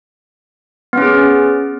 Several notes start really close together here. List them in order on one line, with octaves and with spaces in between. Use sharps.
B3 C#4 G#4